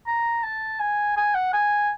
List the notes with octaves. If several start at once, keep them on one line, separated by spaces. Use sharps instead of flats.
A#5
A5
G#5
G#5
F#5
G#5